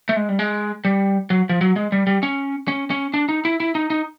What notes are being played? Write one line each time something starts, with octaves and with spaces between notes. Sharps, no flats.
A3
G#3
G3
G#3
G3
F#3
F3
F#3
G#3
G3
G3
C#4
C#4
C#4
D4
D#4
E4
E4
D#4
D#4